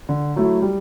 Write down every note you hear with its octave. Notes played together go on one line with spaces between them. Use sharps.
D3
F#3 A3 E4
G3